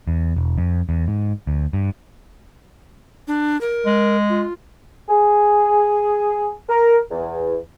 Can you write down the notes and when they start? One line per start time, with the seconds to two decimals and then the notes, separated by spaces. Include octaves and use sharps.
0.08 E2
0.36 E1
0.58 F2
0.89 E2
1.07 G#2
1.47 D2
1.73 G2
3.28 D4
3.61 A#4
3.86 G#3
4.30 F4
5.09 G#4
6.69 A#4
7.11 E2